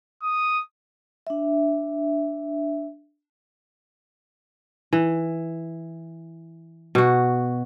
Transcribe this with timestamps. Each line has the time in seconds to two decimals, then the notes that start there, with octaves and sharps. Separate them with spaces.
0.22 D#6
1.27 D4 E5
4.93 E3
6.95 B2 F#4